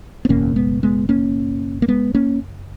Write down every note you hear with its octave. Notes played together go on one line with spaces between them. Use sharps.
B3
F#1 E2 B2 A#3 C#4
G#3 B3
G#3 B3
A#3 C#4
A#3
G#3 B3
A#3 C#4